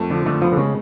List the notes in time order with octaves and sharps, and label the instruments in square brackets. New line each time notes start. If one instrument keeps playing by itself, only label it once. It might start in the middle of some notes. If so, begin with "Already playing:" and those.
Already playing: [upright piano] F2 A3
[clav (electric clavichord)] D3 [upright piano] F3
[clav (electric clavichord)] D3 [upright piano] A3
[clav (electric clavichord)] F3 [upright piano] B3
[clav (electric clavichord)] D3
[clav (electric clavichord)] C#3 [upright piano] G#3